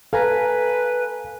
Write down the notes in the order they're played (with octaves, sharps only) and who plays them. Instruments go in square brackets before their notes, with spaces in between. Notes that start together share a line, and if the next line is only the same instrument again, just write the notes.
[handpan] A4 [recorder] B4 [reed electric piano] F5 G#5 A#5